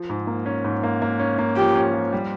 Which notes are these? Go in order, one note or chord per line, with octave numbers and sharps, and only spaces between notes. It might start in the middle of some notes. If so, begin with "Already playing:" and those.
Already playing: F3
G#2
A#3
C#4
G#2
A#3
A#3
C#4
A#3
F3 G4
C#4
F3
G3